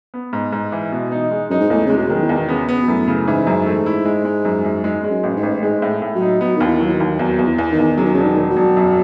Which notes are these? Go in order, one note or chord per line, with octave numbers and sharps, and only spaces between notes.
B3
G#2
G#2
E3
B2
D#4
G#3
F#2 D#4
G#2
E2 A2
C#3 G#3
B2
D#3 F#3
E3
E2
B2
C#3 B3
B3
B2
F#2 A2
C#3
G#2 E3
F#2
A3
E4
G#3
G#3
F#2
F#2
G#2 G#3
G#3
F#2
A1
G#2
A1
G#2 G#3
A2
A2
F#3
D#4
F#3 B3
D#2 D#3
E3
F#3
E3
D#3
D#2
E2 F#3
E2
E3
E2
D#3
E2
C#3 F#3
D#3
E1 C#3
D#3
E1
F#3
E1
F#2